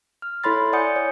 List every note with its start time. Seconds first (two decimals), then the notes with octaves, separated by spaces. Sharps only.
0.22 F6
0.44 E4 A4 C#5 B5 C6 A6
0.73 D5 F#5 G#5 D#6 G6 C#7
0.96 C#5